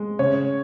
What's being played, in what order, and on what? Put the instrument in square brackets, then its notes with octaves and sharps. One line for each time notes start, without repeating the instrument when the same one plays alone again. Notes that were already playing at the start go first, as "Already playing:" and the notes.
Already playing: [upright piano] G#3
C#3 C#5